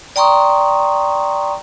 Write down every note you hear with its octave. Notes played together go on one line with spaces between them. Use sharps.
D5 G5 A#5 C6 C#6 D#6